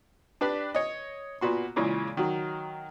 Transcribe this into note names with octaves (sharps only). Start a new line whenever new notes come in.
D4 G4 B4 D5
C#5 D#5
A#2 B3 F#4 C6
A#2 C#3 E3 G#3
D#3 F#3